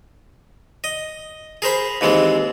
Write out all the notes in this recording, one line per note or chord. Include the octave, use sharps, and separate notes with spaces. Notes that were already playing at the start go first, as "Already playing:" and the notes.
D#5
G#4 A#4 C5 B5
D#2 E3 G#3 C4